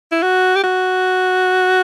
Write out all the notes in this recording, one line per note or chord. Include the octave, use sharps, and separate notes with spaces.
E4
F#4
G4
F#4